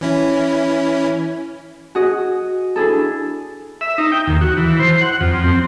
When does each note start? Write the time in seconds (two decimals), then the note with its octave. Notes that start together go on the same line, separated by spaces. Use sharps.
0.01 E3 C#4 E4
1.95 F#4 G#4 D#5
2.76 D4 E4 G#4 A4
3.81 E5
3.98 D#4
4.12 G5
4.27 D#2
4.41 F#4
4.57 E3
4.80 C5
5.01 F#5
5.21 F2
5.44 C4